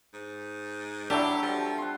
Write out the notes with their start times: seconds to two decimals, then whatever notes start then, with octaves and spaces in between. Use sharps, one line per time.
0.14 G#2
1.10 F#3 A3 D4 E4 G4 A4
1.43 F3 G3
1.78 F#5 C6